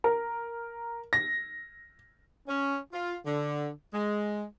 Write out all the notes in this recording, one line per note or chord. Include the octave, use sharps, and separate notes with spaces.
A#4
A#6
C#4
F4
D3
G#3